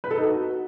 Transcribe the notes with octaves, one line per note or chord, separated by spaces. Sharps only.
B4
A4
D#4
F#4